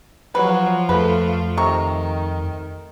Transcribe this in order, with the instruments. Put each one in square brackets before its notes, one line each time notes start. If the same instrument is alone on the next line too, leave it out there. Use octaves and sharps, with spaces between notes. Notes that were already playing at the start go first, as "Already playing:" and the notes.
[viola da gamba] F3 F4 [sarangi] F#3 [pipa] B4
[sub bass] F2 [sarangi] A3 [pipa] B4
[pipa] C3 A#5 C#6 [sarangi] D#3